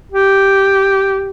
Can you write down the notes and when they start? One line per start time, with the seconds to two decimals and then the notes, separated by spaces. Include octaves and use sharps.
0.12 G4